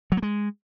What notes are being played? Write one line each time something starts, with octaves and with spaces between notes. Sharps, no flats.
F#3
A#3
G#3